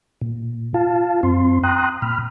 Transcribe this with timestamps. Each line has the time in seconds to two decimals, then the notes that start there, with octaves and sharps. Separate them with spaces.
0.21 A#2
0.74 F4 F5 A5
1.23 F#2 C4 C6
1.63 G5 A#5 C6 D#6 F#6
2.02 A#2 B5 F6